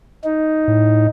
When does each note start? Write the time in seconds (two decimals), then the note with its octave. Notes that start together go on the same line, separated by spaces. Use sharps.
0.24 D#4
0.68 A2